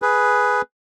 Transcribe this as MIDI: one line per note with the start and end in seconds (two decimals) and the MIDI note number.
0.02 0.62 68
0.02 0.62 71